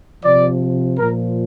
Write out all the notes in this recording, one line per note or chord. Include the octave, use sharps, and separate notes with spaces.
C3 F3 D5
A#2 F3 A#4